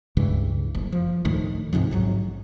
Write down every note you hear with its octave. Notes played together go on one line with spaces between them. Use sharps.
C#2 G2 C#3 E3
F#1
F3
D2 A2 D#3
C#2 G#2 C3 F3
A1 G#2 F#3